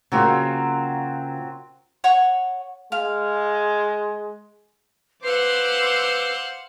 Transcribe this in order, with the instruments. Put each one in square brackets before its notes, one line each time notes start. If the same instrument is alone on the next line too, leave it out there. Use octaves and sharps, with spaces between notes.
[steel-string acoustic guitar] C#3 A#3 F4 [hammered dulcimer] F#3 C4
[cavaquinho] C#5 F#5 C#6
[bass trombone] G#3 [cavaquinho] F5
[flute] B4 [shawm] C5 [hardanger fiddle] F5 F#5 [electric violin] D6 E6